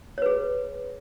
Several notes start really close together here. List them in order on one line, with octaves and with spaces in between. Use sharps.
C#5 B4 G#4